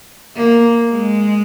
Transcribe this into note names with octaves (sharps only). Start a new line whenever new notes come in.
A#3
G#3